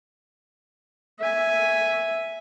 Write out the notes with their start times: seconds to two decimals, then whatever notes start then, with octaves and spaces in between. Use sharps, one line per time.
1.20 E5 G#5